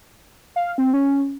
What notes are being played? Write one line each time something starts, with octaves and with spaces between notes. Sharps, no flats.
F5
C4
C#4